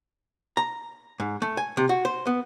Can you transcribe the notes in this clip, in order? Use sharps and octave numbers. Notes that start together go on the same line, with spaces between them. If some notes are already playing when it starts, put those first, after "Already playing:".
A#5
G#2
A3
G#5
C3
F#4
C5
B3